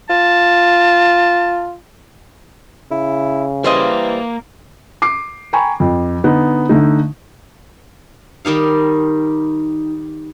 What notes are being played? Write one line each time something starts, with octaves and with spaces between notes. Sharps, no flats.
F4 A5
C#3 E4
E3 G3 A#3 C5 D#5
D6 C7
G5 G#5 A#5 B5 C#6
F2
D3 B3 D#4
D3 A3 D#4
D#3 G3 D#4 F5